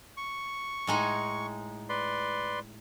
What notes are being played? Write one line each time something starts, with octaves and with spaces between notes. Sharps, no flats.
C#6
A2 G#3 D#4
B4 D5 C6